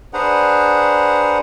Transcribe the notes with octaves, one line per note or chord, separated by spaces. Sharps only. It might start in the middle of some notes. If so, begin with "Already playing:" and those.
D4 G#4 B4 C5 F#5 A#5